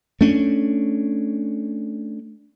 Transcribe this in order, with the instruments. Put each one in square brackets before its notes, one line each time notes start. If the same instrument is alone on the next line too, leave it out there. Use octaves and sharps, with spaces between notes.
[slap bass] A3 C#4 D4